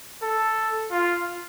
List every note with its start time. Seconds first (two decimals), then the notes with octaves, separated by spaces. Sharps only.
0.23 A4
0.91 F4